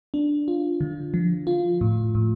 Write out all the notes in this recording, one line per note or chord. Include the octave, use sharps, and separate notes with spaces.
D4
F4
D3
F3
F4
A2
A2